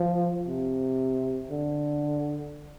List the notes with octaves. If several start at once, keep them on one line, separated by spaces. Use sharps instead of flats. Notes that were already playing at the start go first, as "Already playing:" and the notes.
Already playing: F3
C3
D3